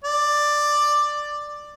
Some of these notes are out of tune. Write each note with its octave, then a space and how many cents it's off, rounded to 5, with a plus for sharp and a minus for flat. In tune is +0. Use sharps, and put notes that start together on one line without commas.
D5 +10